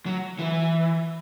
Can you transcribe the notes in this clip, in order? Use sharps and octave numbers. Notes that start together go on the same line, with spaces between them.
F#3
E3